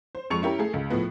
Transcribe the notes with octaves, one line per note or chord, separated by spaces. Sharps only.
C5
F2 G#3 C#6 C#7 F7
C#4 E4 G4 A#4
A3 G#4 A4
C#2
A2 F3 B3